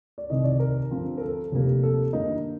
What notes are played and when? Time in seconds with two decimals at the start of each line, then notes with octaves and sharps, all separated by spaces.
0.18 D5
0.30 C2 C3 D#3 D#5
0.44 D5
0.59 A#4
0.91 G2 D3 F3 C4
1.18 A#4
1.21 A4
1.52 F1 F2 C3 G3 A#3
1.83 A4
2.13 G2 D#3 A#3 D#4